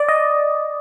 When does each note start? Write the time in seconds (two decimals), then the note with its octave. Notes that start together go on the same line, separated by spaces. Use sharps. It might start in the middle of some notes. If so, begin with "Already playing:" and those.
Already playing: D5
0.09 D#5